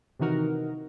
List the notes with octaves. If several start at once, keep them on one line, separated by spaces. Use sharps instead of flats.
C3 D#3 E3 D#4 F#4 A#4